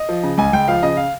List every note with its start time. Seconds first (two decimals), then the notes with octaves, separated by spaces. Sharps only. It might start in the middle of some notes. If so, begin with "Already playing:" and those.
Already playing: D#5
0.09 F3
0.23 C#3
0.38 C#2 G#5
0.53 C#2 G5
0.68 F3 F5
0.83 C#3 D#5
0.97 F5